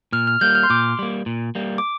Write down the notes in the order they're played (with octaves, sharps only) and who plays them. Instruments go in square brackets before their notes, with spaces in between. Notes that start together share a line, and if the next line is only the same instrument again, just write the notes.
[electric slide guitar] A#2 [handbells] F6
[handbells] F6
[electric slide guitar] G3 A#3 [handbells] G6
[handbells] F6
C6
[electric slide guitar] A#2 [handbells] D6
[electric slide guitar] G3 A#3
A#2
G3 A#3
[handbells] D6